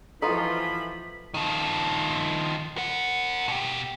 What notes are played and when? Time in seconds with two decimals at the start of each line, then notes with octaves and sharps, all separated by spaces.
0.22 E3 F3 D#4 F4 F#4 A4 A#5 B5
1.34 D#3 F3
2.77 A#4 F#5
3.48 B2 G4